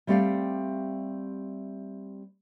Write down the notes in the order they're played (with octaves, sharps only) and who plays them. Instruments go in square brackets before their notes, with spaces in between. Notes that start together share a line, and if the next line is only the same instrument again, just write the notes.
[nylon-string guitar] G3 A3 C4 G4 D5 F5